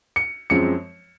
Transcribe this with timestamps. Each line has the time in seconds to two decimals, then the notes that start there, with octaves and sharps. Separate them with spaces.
0.16 C#7
0.50 F#2 F3 G#3 C4 C#7